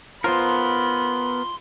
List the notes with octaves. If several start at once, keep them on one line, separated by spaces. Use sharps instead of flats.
B3 F4 A#4 C5 B5 C6